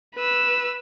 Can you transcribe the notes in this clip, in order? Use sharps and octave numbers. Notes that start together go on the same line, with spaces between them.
B4 E6